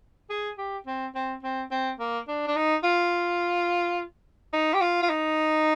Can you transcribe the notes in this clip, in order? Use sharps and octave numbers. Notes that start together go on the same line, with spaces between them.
G#4
G4
C4
C4
C4
C4
A#3
D4
D4
D#4
F4
D#4
G4
F4
F4
D#4